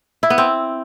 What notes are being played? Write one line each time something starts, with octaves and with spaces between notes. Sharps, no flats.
E4
B3
C4